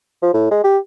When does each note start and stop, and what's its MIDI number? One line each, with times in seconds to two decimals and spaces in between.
0.22 0.32 53
0.34 0.51 45
0.51 0.61 56
0.64 0.78 67